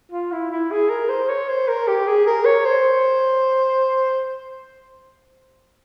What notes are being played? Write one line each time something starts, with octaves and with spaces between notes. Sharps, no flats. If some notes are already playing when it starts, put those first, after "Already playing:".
F4
E4
E4
G#4
A#4
C5
C#5
C5
A#4
G4
G#4
A#4
C#5
C5